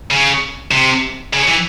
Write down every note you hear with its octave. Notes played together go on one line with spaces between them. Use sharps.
C#3
C3
C#3
E3